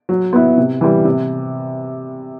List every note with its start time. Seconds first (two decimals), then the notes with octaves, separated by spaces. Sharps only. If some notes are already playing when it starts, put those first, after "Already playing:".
0.09 F#3
0.33 B3 E4
0.58 C3
0.81 E3 G3
1.05 C3